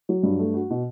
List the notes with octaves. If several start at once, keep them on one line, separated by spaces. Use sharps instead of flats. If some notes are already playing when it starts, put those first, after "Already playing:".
F#3
G2
A3
F#4
B2